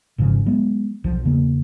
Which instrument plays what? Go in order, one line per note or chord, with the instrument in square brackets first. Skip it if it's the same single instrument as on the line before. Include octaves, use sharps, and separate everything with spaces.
[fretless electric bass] G#1 G#2 C#3 F3
F#3 G#3 B3
B1 F3
E2 C#3 A#3